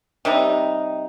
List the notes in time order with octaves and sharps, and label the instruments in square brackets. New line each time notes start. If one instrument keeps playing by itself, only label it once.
[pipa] C3 G3 D#4